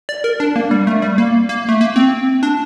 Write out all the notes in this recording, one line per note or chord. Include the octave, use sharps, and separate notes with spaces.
D5
A#4
D4
A#3
G3
A3
G3
A#3
A#3
A3
A#3
C4
D4